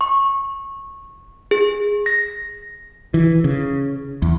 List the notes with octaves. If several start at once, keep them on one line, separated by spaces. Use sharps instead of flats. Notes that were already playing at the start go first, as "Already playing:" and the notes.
C#6
G#4
A#6
E3
C#3
E2